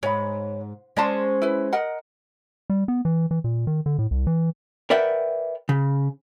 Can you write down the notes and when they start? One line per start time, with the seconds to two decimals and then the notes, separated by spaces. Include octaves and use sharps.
0.03 G#2 C#5 B5
0.97 G#3 C#4 C5 D5 A5
1.42 E4 B4
1.73 A#4 D#5 F#5
2.70 G3
2.88 B3
3.05 E3
3.31 E3
3.44 A#2
3.67 D#3
3.86 D3
3.99 A2
4.11 C2
4.27 E3
4.90 A#4 B4 D5 E5 F#5 G5
5.69 C#3